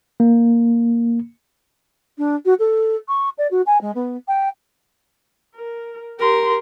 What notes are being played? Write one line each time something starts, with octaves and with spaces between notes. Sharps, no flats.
A#3
D4
F#4
A4
C#6
D5
F#4
G#5
G#3
B3
G5
A#4
G4 A#4 C6